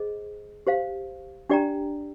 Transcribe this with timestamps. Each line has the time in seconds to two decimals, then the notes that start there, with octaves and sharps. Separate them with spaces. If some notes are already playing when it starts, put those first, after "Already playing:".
Already playing: G#4 C5 D#5
0.67 G4 C5 F5
1.50 D4 G4 D5 G5 A#5